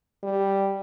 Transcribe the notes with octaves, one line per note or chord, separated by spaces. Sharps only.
G3